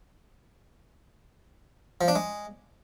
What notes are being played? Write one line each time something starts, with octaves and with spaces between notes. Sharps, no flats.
F3
D4
G#3